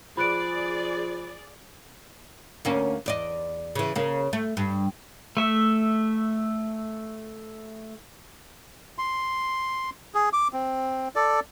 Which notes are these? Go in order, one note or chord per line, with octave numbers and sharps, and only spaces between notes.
F3 G#4 D5 B5 F#6 D7
D2 A#3 C#4
E2 D5 D#5
C#3 E3
C#3 A#3
A3
G2
A3 E5
C6
G#4
D6
C4
A4 D5